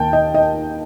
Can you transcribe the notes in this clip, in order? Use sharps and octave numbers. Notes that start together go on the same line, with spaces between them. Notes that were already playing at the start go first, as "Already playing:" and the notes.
Already playing: D#2 D#3 A#3 G5 A5
D#5
D#5